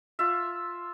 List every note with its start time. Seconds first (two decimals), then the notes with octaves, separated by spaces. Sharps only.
0.19 F4 E5